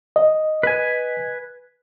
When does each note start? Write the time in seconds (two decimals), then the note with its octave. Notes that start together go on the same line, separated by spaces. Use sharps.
0.16 D#5
0.63 B4 G#5